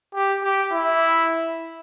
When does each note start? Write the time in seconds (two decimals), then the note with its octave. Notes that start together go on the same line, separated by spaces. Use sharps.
0.15 G4
0.43 G4
0.72 E4